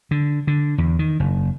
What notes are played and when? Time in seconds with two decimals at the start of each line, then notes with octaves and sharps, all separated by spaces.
0.11 D3
0.47 D3
0.78 E2
0.99 D#3
1.20 F#1